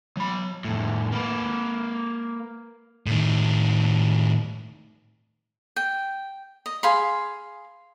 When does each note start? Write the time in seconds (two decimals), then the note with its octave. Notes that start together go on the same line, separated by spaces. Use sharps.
0.17 F#3 B5
0.65 F2 A2
1.12 A#3 B4
3.06 A2 D#3
5.76 G5
6.66 D#5
6.83 G#4 F5 B5 C6